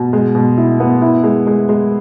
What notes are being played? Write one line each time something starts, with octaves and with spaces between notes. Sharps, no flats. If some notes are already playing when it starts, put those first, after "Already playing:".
Already playing: B2
G#3
B2
E4
B3
E4
G#3
G#3
G#3